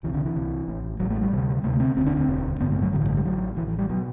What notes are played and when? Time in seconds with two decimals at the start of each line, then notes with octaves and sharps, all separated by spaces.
0.03 C2 C3 E3
0.14 D3
0.25 E3
0.36 C2 C3
0.68 A1 A2
1.00 A1 A2 F#3
1.10 A3
1.21 G3
1.33 D2 C3
1.64 D2 C3 A3
1.80 C4
1.96 E1 D2 D3 C4
2.06 D4
2.17 C4
2.29 E1 D2 D3
2.61 A1 G2 D3 B3
2.72 A3
2.82 F#3
2.93 A1 G2 D3 F#3
3.01 E3
3.09 A3
3.17 G3
3.25 A1 A2 F#3
3.57 A1 E3
3.60 A2
3.68 E3
3.78 G3
3.90 B2 F#3